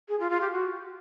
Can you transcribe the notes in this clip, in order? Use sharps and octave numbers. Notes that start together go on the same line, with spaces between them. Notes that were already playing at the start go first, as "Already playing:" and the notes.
G#4
F4
F4
G4
F#4